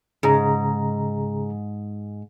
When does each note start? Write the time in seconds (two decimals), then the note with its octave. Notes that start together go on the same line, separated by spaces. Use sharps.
0.23 G#2 C#3 G#4 A#5